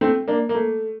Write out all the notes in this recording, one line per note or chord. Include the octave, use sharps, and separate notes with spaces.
A3 C4
A#3 D4
A#3
A3